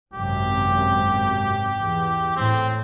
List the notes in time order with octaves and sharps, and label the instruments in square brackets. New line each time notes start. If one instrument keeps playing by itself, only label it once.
[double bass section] G#1 F#2 C3 [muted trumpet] G4
[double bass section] E2
[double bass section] A2 [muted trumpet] C4